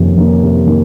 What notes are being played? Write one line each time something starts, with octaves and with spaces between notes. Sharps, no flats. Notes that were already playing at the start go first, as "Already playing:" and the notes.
Already playing: F2 C3 D#3 A#3 C#4
D#3 A#3 C#4
C3
D#3 A#3